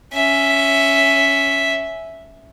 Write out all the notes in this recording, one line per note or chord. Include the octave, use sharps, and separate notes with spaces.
C#4 E5